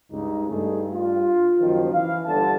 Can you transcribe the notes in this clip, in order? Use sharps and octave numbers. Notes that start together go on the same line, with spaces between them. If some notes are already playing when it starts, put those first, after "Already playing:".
C#2 G2 D#4
G2 A3 D#4 G#4
F4
F#1 D#3 F3
E3 F5
G1 D3 A5